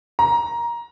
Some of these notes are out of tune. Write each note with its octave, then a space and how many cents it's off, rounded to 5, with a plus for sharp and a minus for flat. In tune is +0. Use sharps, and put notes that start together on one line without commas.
A#5 +15